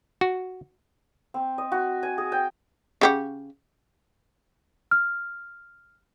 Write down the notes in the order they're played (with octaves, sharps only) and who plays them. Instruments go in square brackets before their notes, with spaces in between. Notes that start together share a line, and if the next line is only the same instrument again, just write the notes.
[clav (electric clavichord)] F#4
[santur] C4
D#5
F#4
G#5
G#4
G5
[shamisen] C#3 G4 F#5
[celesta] F6